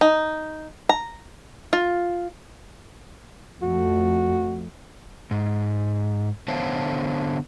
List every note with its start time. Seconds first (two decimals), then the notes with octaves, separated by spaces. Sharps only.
0.01 D#4
0.89 A#5
1.73 F4
3.62 F2 A3 F#4
5.31 G#2
6.48 D3 B3 C5 C#5 F5 A5